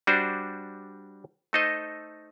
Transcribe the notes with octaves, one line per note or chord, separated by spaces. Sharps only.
G3 D4 F#4 C5
A3 D#4 A4 C5 D#5